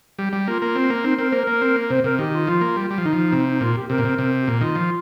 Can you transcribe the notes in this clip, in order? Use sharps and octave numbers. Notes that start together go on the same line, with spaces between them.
G3
G3
A#3 F4
A#3
C4
A#3
C4 D#4
C4 A#4
A#3 C5
A#4
A#3
C4
A#3
C3 C5
C3 A#4
D#3 G4
F4
F3 F4
A#3
G3
G3
F3
D#3 D#4
F3
C3
D#4
A#2 F4
G4
C3 A#4
A#2
C3
C3
G4
A#2 A#4
D#3 F4
F3